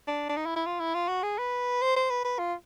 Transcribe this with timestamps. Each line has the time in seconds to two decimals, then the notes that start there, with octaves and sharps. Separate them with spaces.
0.08 D4
0.29 D4
0.36 D#4
0.46 E4
0.56 E4
0.66 F4
0.80 E4
0.95 F4
1.08 F#4
1.23 G#4
1.38 B4
1.81 C5
1.96 C5
2.10 B4
2.24 B4
2.39 F4